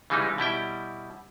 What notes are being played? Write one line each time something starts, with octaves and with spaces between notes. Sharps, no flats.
C#3 E3 G3 G#3 D#4
B2 G3 E4 G5